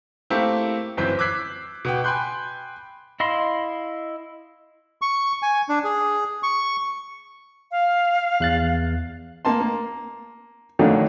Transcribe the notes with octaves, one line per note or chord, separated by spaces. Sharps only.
A3 A#3 C4 E4 G4
G1 F#2 E3 C4 G6 B6
D6 E6 F#6 G#6 B6 C7
B2 B3 G5
G5 G#5 B5 C6 F#6 G6
E4 D#5 F5 B5 C6
C#6
G#5
D4
G#4
C#6
F5
E2 F#6 A6
A#3 A5 C6
A#3
F2 D3 D#3 F#3 A3 A#3